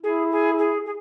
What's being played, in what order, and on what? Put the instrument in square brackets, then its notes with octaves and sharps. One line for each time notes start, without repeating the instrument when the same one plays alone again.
[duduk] E4 [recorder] G#4
[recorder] G#4
G#4
G#4